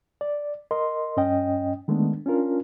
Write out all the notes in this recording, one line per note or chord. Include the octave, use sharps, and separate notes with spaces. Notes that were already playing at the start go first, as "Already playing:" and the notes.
D5
A#4 D#5 C6
G2 C#4 D#5 G5
D#3 G#3 A3 B3 D4
C#4 D4 F4 A#4